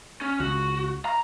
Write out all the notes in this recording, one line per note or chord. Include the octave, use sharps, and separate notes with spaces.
C#4
C#2 F#4
A#5